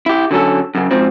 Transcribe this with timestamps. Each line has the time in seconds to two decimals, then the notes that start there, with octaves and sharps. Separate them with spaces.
0.06 E4 G4
0.31 D3 F#3 C#4 A4
0.75 F#2 C#3
0.91 G#2 F3 C4